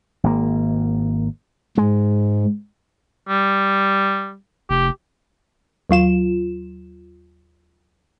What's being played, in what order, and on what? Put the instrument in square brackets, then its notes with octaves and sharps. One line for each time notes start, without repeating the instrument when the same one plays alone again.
[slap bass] G#1 A#3
[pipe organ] G#2 [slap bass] G#3
[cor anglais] G3
[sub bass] F1 [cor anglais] G4
[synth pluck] D#2 F#3 F4 E7